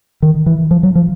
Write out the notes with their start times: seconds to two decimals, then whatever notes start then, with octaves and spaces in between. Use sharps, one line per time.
0.22 D#3
0.46 E3
0.71 F3
0.83 F#3
0.95 F3